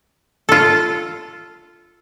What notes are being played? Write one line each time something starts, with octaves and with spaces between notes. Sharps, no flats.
F4 A4